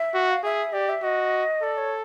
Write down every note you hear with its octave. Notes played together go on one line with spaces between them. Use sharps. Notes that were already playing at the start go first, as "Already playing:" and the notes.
Already playing: E5
F#4
F5
G#4 E5
G4 D5
E5
F#4 D#5
A4 D5
C#5